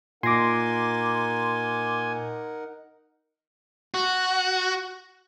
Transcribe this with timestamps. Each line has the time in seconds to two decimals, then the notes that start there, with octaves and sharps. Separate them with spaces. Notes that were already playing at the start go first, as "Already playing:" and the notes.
0.23 A#2 D#4 A#4 F#5 G#5 C6 D6 A#6
3.94 F#4